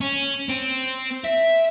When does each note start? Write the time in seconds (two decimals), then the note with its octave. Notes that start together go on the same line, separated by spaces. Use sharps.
0.01 C#4
0.49 C4
1.24 E5